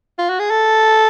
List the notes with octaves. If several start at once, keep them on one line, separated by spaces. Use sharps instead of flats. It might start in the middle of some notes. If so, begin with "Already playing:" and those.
F4
F#4
G#4
A4